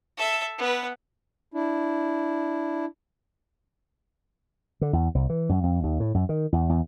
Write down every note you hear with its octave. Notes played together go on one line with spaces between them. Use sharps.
A4 E5
B3 B4
D4 E4
D3
E2
C2
E3
F#2
F2
D#2
A2
F#2
D#3
E2
E2